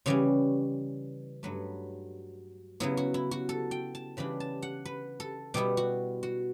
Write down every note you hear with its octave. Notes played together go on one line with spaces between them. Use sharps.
C#3 E3 G3 C#4 C#5
G2 F#3 A3 B4
C#3 F#3 B3 E4
F#4
E4
F#4
A4
G5
A5
C#3 E3 G3 D4 B5
A5
F#5
B4
A4
B2 G3 B3 E4 G4
F#4
F#4